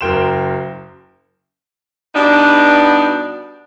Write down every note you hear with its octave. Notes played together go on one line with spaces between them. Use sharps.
F#1 F#3 A#4 G5 C6 E7
B2 G3 B3 D4 D#4